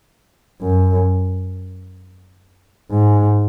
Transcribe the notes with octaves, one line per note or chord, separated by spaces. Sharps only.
F#2
G#2